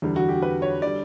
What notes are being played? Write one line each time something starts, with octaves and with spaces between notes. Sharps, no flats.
E2 D3 G3
F#4
G4
B4
C#5
D3 G3 D5